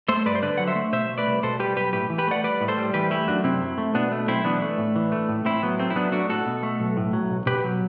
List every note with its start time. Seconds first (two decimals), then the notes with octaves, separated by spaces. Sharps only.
0.08 A3 A4 C5
0.26 G2 B4 D5
0.35 C5
0.42 D3 B4 D5
0.58 F#3 F#5
0.67 C5 E5
0.75 A3
0.92 B2 C5 E5
1.09 A3
1.18 B4 D5
1.27 C2
1.43 B2 A4 C5
1.60 G3 G4 B4
1.77 B1 G4 B4
1.93 A2 G4 B4
2.10 E3
2.18 G4 B4
2.27 A3 D5 F#5
2.44 G3 B4 D5
2.61 A2
2.68 A4 C5
2.78 G3
2.94 E3 G4 B4
3.10 A3 E4 G4
3.27 F#2 D4 F#4
3.44 C3 C4 E4
3.62 F#3
3.78 A3
3.94 B2 B3 D4
4.12 A3
4.28 B1 C4 E4
4.44 E3 B3 D4
4.62 A3
4.78 A2
4.96 E3
5.12 A3
5.29 A2
5.45 A2 C4 E4
5.63 F#3 B3
5.79 A3 C4
5.90 E4
5.96 F#3 B3 D4
6.12 A3 D4 F#4
6.29 A2 F#4 A4
6.46 B2
6.63 A3
6.80 B1
6.97 A2
7.13 F#3
7.30 B1
7.46 B2 G4 B4
7.64 F#3